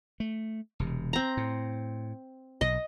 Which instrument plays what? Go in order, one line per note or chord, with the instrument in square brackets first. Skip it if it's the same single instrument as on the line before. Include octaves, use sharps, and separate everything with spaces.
[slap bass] A3
E1 C3
[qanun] C4 A#5
[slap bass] A2
[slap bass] B1 [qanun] D#5